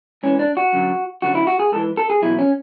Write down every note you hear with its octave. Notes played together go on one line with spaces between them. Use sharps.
G#2 E3 C#4
D4
F#4
F#2 D3 F#3
F#2 D3 F#3 F#4
E4
F#4
G#4
G#2 E3 A4
A4
G#4
E2 B2 F#3 E4
C#4